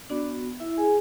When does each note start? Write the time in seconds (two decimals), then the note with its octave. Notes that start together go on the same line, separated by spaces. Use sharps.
0.10 B3 D4 F#4 D5
0.60 E4 E5
0.77 G#4 G#5